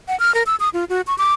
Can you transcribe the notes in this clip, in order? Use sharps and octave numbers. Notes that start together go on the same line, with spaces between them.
F#5
F6
A#4
E6
D#6
F4
F#4
C#6
D6